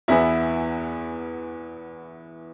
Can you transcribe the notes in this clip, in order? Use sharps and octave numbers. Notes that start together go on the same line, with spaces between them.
E2 E3 B3 E4